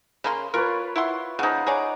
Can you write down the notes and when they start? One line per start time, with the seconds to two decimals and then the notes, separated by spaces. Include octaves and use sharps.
0.24 C#3 A#3 B5 C6
0.54 F4 A#4 B4 C#5
0.96 E4 F#5 C6
1.39 C#3 F3 D#4 F#5
1.67 G#4 C#5 D5 A#5